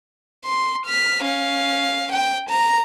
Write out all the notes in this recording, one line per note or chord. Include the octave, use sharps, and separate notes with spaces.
C6
F6 B6
C#4 F5
G5
A#5